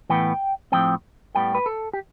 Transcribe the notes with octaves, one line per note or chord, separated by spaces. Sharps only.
A2 E3 B3 G5
A2 F3 C4 G5
A2 G3 B3 G5
B4
A4
G4